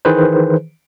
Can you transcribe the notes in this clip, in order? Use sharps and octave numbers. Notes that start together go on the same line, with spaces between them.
D#3 E3 G#4 B4 C5